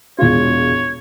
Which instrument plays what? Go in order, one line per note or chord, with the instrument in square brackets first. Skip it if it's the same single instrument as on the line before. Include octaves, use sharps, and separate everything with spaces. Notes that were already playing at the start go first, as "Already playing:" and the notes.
[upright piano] E1 G#3 F4 [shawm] C#5